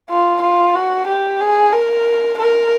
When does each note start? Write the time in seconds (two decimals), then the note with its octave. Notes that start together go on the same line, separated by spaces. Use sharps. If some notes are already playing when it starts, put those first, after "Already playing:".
0.10 F4
0.43 F4
0.75 F#4
1.08 G4
1.41 G#4
1.73 A#4
2.39 A#4